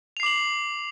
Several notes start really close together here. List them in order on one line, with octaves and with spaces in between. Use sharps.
F7 C7 D6 F#7